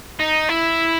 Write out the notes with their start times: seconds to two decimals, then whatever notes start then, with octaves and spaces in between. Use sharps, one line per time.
0.20 D#4
0.49 E4